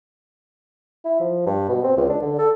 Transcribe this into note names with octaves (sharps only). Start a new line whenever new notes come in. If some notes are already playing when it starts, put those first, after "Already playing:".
E4
F3
G2
B2
C4
C#2
D4
D3
A4